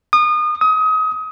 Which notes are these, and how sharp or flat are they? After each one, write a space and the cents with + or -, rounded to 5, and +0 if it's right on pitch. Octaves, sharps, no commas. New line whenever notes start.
D#6 -30
D#6 +30